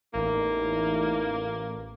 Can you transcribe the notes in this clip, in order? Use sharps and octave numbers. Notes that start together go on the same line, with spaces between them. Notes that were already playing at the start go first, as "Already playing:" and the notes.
A1 E2 A#3 D#4 E4